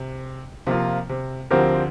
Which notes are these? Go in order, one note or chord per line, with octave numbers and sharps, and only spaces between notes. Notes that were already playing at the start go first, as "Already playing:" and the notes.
Already playing: C3
C3 F3 A#3 F4
C3
D2 D3 F3 C4 G4 A#4